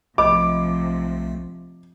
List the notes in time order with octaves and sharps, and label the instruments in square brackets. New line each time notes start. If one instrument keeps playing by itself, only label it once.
[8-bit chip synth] B1 A3 [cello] C3 F3 [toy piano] D#5 B5 [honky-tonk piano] D6